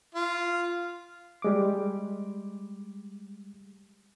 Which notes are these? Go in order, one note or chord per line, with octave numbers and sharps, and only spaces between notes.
F4
G3 G#3 D6